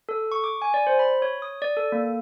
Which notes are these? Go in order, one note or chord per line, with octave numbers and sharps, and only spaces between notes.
A4
C#6
D6
G#5
D5
C5
B5
C#5
D#6
D5
A4
A#3